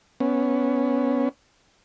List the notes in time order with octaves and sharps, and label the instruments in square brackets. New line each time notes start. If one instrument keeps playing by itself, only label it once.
[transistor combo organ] B3 C#4